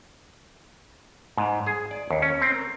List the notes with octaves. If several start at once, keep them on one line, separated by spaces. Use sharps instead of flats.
G#2
G#4
D5
D#2
C#4
C4
A#4